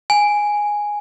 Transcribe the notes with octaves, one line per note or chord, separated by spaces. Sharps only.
G#5